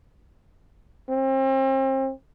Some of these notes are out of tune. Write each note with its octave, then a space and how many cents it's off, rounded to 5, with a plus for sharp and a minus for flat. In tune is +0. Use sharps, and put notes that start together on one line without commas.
C4 +35